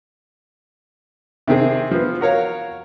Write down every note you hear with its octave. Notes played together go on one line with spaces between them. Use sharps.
C3 D#3 C4 G#4
F3 B3
F#4 A#4 C#5 F5